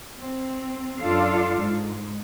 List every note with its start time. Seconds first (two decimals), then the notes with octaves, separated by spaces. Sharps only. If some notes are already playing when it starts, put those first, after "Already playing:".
0.19 C4
0.99 F#2 D4 F4 A4 F5
1.58 G#2